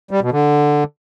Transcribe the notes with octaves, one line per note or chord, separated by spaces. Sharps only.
G3
B2
D3